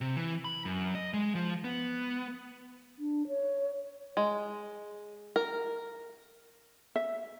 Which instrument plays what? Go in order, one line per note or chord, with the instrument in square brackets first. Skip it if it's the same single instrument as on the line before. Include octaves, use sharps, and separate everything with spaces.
[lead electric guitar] C3
E3
B5
F#2
D#5
G#3
F3
B3
[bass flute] D4
C#5
[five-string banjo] G#3
A#4
[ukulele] E5